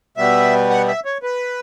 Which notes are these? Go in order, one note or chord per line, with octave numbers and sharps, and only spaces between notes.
B2 G3 B3 E5
F#5
E5
C#5
B4